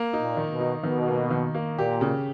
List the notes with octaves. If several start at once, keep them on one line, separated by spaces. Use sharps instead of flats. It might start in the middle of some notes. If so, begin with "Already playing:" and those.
Already playing: A#3
D#4
A#2
D#3
B2
D#4
B2 D#3
A#3
D#3
A#3
A#2 G4
C#3